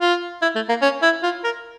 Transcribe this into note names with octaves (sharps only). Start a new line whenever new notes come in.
F4
E4
A3
A#3
C#4
E4
F4
A#4